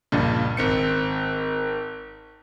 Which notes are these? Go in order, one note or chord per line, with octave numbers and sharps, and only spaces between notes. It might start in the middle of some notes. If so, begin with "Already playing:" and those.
C#2 G2 A#2 F3
G#1 C4 C#7